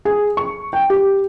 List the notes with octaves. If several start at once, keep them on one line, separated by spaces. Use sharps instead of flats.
G#4
C#6
G5
G4